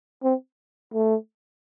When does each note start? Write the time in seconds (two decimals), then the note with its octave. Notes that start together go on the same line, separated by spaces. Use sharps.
0.23 C4
0.94 A3